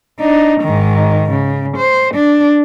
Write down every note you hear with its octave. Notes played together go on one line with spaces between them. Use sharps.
D4 D#4
G#2 D#3
C#3
C5
D4